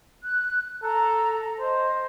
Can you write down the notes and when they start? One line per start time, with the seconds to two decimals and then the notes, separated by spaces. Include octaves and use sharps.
0.23 F#6
0.83 A4 A#5
1.60 C5 D#5